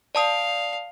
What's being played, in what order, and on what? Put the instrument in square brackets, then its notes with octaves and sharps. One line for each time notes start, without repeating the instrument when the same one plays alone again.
[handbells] D5 A5 D#6 [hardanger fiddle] F5